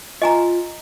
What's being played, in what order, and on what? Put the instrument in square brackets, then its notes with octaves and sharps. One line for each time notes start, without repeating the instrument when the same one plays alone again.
[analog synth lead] F4 [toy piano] D#5 G#5 A#5